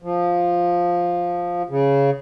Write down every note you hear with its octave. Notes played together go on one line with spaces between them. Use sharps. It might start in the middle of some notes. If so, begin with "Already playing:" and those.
F3
C#3